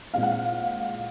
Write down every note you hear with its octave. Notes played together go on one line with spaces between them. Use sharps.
A#2 G#3 C4 F5
F#5
F5